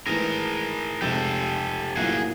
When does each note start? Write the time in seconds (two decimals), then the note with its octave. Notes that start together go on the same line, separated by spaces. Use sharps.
0.06 G#2 E3 A3 G#4 A#4
1.01 F1 F2 C3 F3 G#3 G4 A4
1.96 B1 A2 F3 A#3 F#4 G#4